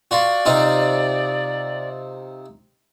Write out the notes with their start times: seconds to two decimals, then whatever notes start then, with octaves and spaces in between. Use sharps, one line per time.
0.11 F4 F#4 D5
0.46 C3 D#4 F4